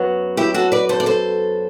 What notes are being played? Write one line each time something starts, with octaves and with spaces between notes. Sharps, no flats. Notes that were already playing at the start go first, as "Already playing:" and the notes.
Already playing: F#2 F#3 B3
E4 G4
F#4 A4
B4 D5
A4 C5
D5
A4 C5